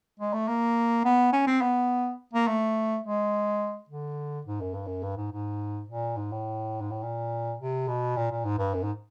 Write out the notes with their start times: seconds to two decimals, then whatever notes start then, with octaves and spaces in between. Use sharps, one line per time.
0.20 G#3
0.33 A3
0.48 A#3
1.05 B3
1.33 C#4
1.47 C4
1.61 B3
2.33 A#3
2.47 A3
3.04 G#3
3.89 D3
4.46 G#2
4.61 F#2
4.74 G2
4.87 F#2
5.03 G2
5.17 G#2
5.32 G#2
5.88 A#2
6.17 G#2
6.32 A2
6.81 G#2
6.91 A2
7.03 A#2
7.59 C3
7.88 B2
8.17 A#2
8.31 A#2
8.45 G#2
8.59 G2
8.74 F#2
8.83 G#2